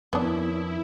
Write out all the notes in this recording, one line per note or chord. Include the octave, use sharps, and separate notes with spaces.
F2 D#3 B3 D4 E4 A#4 C#5 D#6